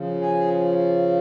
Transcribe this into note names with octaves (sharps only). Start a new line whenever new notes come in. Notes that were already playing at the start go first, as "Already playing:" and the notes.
Already playing: C#3 F3
G#4